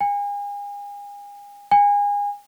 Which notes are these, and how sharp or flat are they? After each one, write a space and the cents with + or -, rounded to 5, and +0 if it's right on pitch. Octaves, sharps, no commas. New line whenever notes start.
G#5 -40
G#5 -30